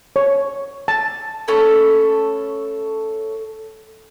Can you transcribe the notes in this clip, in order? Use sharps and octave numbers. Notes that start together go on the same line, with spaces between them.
C#5
A5
A3 C#4 A4 B5